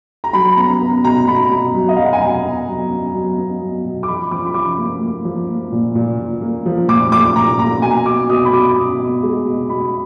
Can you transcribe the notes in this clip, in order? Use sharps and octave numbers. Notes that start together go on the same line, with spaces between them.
A#5
F#3 B5
B3 A#5
B3
B2 A#5
B2 B5
B2
F#3
D#5
F#3 F5
F#5
G#5
B2 A#5
B3
F#3
B3
F#3
B3
F#3
B2
D6
F3 B5
F3 D6
B5
F3 D6
A#3
A#3
F3
A#3
A#2
A#2
A#2
A#3
F3
A#2 D6
A#2 D6
A#2 A#5
A#3 A#5
B2 G#5
B2 D6
B2 D#6
B5
B2 D6
B3
B2
G#3
B2
B2 B5